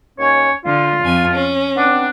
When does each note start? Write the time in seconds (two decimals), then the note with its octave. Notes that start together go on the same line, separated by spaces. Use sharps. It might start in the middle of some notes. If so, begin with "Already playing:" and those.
0.19 D#2 C#4 C#5
0.65 D3 F4
1.02 F2 G#5
1.32 C#4
1.77 B3 C4 D4